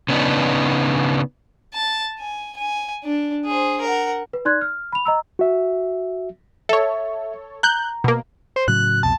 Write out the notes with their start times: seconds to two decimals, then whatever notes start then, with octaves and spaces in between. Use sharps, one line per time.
0.09 C#3 B3 D4 D#4
1.74 A5
2.19 G#5
2.57 G#5
3.04 D4
3.45 G#4 C5
3.81 A#4 F#5
4.33 B4
4.45 D#4 D5 C6 F#6 G#6
4.61 F6
4.92 B5 F7
5.05 D#5 A#5 E6
5.39 F#4 E5
6.69 A4 C#5 E5
7.63 A#5 F#6 G6
8.04 B2 A#3
8.56 C5
8.68 A2 C#3 F#3 F#6
9.03 C2 F2 B2 A5